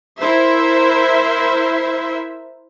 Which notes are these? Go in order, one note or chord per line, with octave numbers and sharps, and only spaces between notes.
E4 A#4 C5 E5